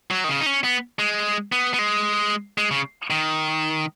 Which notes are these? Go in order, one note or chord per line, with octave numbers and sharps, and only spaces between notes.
F#3
D#3
C#3
D#4
C#4
B3
G#3
B3
B3
G#3
G#3
C#3
D#3